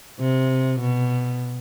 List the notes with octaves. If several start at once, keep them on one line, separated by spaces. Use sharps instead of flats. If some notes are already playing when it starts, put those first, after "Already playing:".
C3
B2